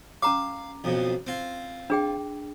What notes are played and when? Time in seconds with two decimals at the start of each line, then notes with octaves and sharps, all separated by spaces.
0.22 C#4 F5 A#5 D6
0.84 B1 F2 B2
1.27 C4 F4
1.90 D4 G#4 G5